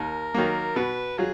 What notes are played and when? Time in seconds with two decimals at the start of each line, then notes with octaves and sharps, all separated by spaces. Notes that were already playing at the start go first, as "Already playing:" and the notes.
Already playing: D#2 A#4
0.34 D#3 F#3 A#3
0.76 B2 B4
1.18 F#3 F4 G#4